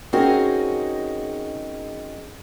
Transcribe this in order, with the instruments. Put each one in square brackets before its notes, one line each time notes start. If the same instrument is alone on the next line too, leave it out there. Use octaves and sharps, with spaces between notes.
[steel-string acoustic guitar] C4 C#4 D#4 F#4 G#4 A#4